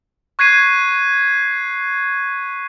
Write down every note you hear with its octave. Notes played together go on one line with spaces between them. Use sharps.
C#6 F#6 G#6 B6 C7 D#7